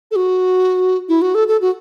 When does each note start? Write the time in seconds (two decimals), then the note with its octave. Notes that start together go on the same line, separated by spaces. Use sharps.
0.11 A4
0.16 F#4
1.09 E4
1.22 F#4
1.35 A4
1.48 A4
1.61 F#4